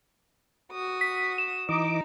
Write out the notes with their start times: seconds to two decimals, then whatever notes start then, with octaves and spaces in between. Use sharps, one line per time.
0.72 F#4 D#6
1.01 B6
1.38 E7
1.69 E3 D#4 D#5 D6